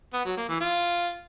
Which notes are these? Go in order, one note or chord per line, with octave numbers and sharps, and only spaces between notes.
B3
F#3
A#3
E3
F4